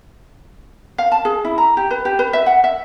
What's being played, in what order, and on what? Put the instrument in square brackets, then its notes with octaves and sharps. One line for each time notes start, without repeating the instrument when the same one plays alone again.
[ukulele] F5
A5
G#4
E4
A#5
G4
B4
G4
B4
E5
F#5
E5